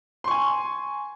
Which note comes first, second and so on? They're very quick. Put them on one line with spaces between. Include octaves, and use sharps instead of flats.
C6 C#6 G#5